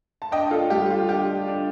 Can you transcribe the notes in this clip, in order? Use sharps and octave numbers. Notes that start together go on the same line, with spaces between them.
A5
D4 D#5 G5
F4 A4
G3 G4
F4
D4 G4
D4